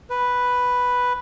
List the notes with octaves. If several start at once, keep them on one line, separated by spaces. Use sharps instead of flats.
B4